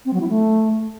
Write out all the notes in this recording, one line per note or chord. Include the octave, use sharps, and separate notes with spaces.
C4
F#3
E4
A3